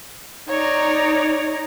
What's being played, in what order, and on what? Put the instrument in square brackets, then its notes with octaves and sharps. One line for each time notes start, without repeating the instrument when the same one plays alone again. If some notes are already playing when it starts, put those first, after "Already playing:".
[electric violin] D#4 A#5 [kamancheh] C#5 D5